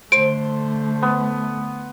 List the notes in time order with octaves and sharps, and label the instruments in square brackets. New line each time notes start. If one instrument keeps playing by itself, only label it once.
[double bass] D3 A3 [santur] C5 [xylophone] D7
[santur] B3